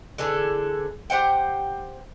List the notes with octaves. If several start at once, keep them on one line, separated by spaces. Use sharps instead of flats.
D3 E3 G#4 A4
G4 C5 F#5 G5